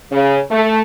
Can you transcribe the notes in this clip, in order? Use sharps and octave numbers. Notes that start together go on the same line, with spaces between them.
C#3
A3